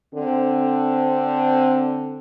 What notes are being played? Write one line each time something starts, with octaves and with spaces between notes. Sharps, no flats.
D3 C4